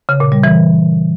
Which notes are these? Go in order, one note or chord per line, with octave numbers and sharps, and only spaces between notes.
C#3
A#2
G3
E3